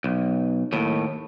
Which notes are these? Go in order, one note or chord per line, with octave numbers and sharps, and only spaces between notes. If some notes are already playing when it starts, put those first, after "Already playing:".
B1
D#2 A2